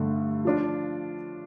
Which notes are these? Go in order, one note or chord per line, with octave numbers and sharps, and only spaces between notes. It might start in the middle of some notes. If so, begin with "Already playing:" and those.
Already playing: G2 D3 A3
F3 D4 F4